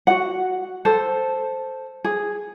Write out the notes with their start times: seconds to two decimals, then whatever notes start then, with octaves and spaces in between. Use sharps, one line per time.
0.07 F#4 F#5
0.85 A4 C5
2.04 G#4